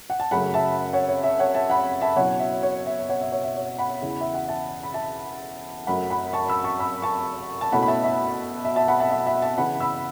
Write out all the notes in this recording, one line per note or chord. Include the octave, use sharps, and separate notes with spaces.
F#5
A5
F#2 C#3 F#3 A3 F#5 B5
E5 A5
C#5 F#5
C#5
E5
C#5 F#5
E5 A5
F#5 B5
E5 A5
B2 F#3 C#4 E4 C#5 F#5
E5
C#5
E5
C#5 F#5
E5
C#5
E5
C#5
F#5 B5
E2 C#3 E3
E5
F#5
E5 A5
B5
E5 A5
F#2 F#3 A3 F#5 B5
F#5 B5
A5 C#6
B5 E6
A5 C#6
B5 E6
A5 C#6
A5
B2 A3 C#4 E4 F#5 B5
B5
E5 A5
E5
E5
E5 A5
F#5 B5
E5 A5
E5
E5
E5 A5
C#3 E3 B3 E4 F#5 B5
B5 E6